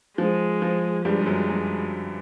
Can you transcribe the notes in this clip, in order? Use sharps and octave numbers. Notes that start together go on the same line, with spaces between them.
F3 G#3
F3
G2 G3 G#3
G3
F#2 F#3
F#2 F#3